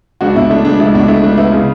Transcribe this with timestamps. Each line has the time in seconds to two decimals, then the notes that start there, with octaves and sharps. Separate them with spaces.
0.21 C#2 D4 F#4
0.35 B2 E4
0.50 A3 D4
0.65 C#2 D4
0.80 C#2 E4
0.95 B2 D4
1.08 A3 E4
1.23 C#2 D4
1.38 B3 E4
1.52 C#3